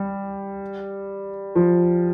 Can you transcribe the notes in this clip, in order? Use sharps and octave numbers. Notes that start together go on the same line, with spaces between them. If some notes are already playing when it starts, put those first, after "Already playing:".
Already playing: G3
F3